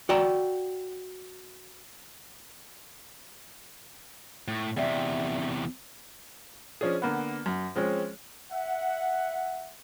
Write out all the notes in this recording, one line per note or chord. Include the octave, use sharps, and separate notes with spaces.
F#4 D5 G5 A5 A#5
A2
E2 C3 D5 E5 G5
F3 C#4 D4 G#4
D3 A#3 B3
F#2
F3 G#3 C4 C#4
E5 F#5